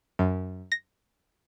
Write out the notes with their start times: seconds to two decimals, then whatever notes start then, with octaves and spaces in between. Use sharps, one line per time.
0.19 F#2
0.72 A#6